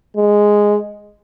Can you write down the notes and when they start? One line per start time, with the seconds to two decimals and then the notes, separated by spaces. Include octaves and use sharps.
0.16 G#3